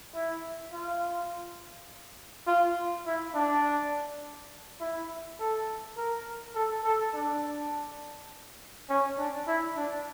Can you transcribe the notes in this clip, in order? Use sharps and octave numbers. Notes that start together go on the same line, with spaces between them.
E4
F4
F4
E4
D4
E4
A4
A#4
A4
A4
D4
C#4
D4
E4
D4